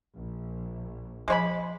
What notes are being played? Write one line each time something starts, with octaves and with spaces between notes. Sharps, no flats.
A#1
F3 G#3 C#5 B5